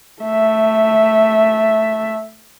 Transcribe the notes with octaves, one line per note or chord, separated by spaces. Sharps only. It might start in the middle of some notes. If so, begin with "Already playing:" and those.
A3 E5